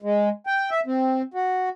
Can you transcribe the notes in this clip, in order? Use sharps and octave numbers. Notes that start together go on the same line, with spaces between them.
G#3
G5
E5
C4
F#4